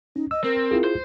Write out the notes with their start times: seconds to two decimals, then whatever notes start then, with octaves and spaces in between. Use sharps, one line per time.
0.16 C#4 D#4
0.31 D#5 E6
0.44 C4 A#4
0.71 E4 F4 G#4
0.84 C5